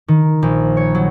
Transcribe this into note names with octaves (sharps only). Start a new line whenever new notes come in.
D#3
A#1
C#5
F#3